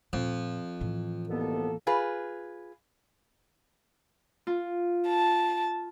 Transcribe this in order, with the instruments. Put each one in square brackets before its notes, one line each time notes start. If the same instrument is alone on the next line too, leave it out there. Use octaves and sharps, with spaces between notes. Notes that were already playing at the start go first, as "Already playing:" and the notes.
[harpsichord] F2 [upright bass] A#2 A3
[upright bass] A2 E3
[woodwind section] C2 B2 B3 [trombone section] F2 A#3 A4
[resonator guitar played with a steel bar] F4 G#4 B4
[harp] F4
[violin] A5